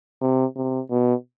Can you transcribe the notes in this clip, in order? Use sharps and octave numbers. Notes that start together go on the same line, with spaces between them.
C3
C3
B2